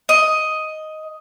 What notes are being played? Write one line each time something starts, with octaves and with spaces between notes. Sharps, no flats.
D#5